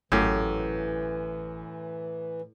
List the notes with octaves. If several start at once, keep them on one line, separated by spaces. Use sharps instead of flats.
G#1 F#2 A2 E3 G4 F5